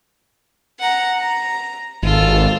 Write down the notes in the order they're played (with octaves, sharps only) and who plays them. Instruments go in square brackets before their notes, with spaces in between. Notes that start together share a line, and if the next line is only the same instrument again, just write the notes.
[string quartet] F#5 A#5
A#5
[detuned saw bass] G#1 [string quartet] F4 A4